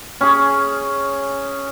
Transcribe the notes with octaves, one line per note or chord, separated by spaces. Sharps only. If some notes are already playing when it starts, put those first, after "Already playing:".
C#4 G#4